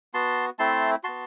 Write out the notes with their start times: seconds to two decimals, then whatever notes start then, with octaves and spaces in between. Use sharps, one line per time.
0.14 B3 F#4 A5 C6
0.59 A3 C4 E4 A5 C6
1.04 B3 F#4 A5 C6